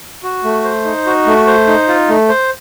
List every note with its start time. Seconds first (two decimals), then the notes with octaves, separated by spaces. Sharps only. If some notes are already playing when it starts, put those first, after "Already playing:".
0.23 F#4
0.44 A3
0.64 C5
0.85 D#4
1.06 F#4
1.26 A3
1.47 C5
1.67 D#4
1.88 F4
2.09 A3
2.29 C5